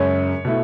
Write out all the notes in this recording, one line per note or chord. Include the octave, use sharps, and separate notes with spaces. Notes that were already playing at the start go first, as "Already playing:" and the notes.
Already playing: F#2 C#3 G#3 C#5
B2 A3 E4